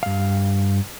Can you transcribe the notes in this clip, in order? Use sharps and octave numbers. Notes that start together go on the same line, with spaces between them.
G2 F5